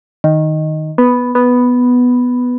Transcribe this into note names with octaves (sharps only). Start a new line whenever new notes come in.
D#3
B3
B3